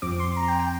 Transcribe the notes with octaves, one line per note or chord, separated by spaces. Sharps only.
F2 F3 C4 D6
C6
A#5
G5
G5